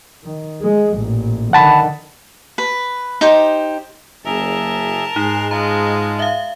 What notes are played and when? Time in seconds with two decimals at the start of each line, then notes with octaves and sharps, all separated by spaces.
0.23 D#3
0.61 G#3
0.95 A1 A#2
1.53 D3 D#3 F#5 A5 B5
2.58 B4
3.21 D#4 G4 C5
4.25 F#1 G#4 A#4 E5 A5
5.16 G#2 D#4 G#4 C6 F#6
5.51 G#3 F4 D#5 A5 A#5
6.19 E5 F5